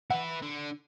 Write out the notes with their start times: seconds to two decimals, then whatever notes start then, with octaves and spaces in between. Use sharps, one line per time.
0.11 E4 B4 F#5
0.42 D3